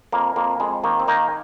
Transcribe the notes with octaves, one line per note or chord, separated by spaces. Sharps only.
F2 A#3
F2 A#3
F2 G#3
D#3 A#3
C4
D#3 A#3 D#4